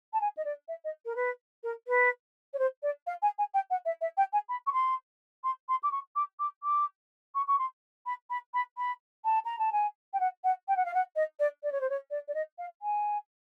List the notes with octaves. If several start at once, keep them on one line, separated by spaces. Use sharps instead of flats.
A5
G#5
D#5
D5
E5
D#5
A#4
B4
A#4
B4
C#5
C5
D5
F5
G#5
G#5
G5
F#5
E5
E5
G5
G#5
B5
C#6
C6
C6
C6
D6
C#6
D6
D6
D6
C#6
C#6
C6
B5
B5
B5
B5
A5
A#5
A5
G#5
G5
F#5
F#5
G5
F#5
F5
F#5
D#5
D5
D5
C#5
C5
C#5
D5
D5
D#5
F5
G#5